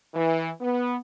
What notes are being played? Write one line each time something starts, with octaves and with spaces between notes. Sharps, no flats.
E3
B3